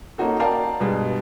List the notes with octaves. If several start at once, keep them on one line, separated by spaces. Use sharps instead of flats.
A#3 C#4 D#4 F#4 A4
A#4 D5 F5 G5 A5
G2 B2 G#3